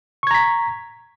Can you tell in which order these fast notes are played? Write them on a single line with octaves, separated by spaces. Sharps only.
C#6 G#6 A#5 B6